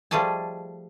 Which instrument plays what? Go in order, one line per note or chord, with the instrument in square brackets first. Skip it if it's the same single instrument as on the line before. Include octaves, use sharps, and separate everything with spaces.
[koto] F3 G3 A3 G#4 D#5 A5